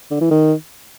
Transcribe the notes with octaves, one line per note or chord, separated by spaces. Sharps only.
D3
E3
D#3